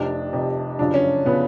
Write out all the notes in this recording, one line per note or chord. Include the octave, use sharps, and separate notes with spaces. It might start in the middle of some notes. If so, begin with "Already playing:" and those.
Already playing: F1 F2 C3 D4
F1 F2 C3
G1 F#2 C#3 F3 D4
C#4
C#3 F3 B3